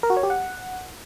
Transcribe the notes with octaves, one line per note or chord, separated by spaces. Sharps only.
A#4
F#4
C#5
G4
F#5